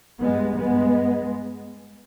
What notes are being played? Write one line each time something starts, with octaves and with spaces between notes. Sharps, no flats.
G2 G#3 B3
G#3 B3